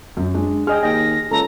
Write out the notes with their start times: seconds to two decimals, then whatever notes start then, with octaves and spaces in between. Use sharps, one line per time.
0.17 F#2
0.34 G#3 D4
0.67 G#4 D#5 G5 F6
0.83 D#2 D#5 G5 A#6
1.31 C#2 A4 A#5